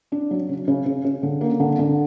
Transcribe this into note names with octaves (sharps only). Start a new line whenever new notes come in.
D4
F#3
C#3
C#3
C#3
C#3
D3
A#3
D3
D3